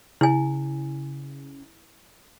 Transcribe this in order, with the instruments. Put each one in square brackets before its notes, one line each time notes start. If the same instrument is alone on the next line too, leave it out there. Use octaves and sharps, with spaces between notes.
[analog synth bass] C#3 [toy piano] E4 G#5